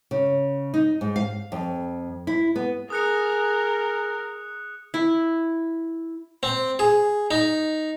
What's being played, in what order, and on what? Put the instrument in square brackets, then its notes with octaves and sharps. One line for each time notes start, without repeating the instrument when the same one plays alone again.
[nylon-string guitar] C#3
D#4
G#2
F5
F2
E4
B3
[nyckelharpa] G#4 [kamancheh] A#4 [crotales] D#6 F#6 C#7
[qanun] E4
[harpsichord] C4
G#4
D#4